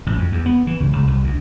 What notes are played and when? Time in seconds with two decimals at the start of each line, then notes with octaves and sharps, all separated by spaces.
0.06 A1
0.18 F2
0.32 E2
0.46 B3
0.67 E3
0.80 C#2
0.93 C#2
1.07 C2
1.24 D2